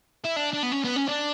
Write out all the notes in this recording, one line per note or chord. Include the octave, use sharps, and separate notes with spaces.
E4
D4
D4
B3
C#4
B3
C#4
D4